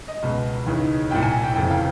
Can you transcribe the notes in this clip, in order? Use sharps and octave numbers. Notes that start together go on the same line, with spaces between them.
D#5
C#2 B2
D#2 C#3 E3
C2 A#2 G5
G#5
G5
F1 F2 C#3 E3 G5
F5